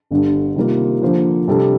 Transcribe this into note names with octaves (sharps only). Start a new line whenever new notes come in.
G1 G2 D3
C3 D#3 G3 A#3 F4
D3 F3 A#3 F4 C5
C3 G3 D4 A4